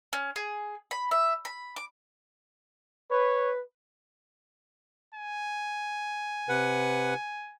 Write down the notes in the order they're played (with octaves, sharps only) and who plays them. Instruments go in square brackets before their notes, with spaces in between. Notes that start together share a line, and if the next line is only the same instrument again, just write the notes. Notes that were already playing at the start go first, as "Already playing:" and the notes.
[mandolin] C#4
G#4
B5
E5
B5
D6
[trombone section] B4 [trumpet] C#5
[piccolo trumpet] G#5
[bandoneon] C3 B4 F#5